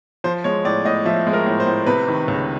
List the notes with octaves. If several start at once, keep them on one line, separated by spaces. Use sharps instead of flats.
F3 C5
G#3 C#5
A2 D5
A2 D#5
F3 E5
G#3
A#4
A2
C5
A2
C3 B4
D#3
C#2